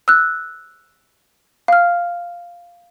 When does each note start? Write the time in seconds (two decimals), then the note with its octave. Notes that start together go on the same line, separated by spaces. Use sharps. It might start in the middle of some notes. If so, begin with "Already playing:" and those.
0.08 E6 F#6
1.68 F5 F6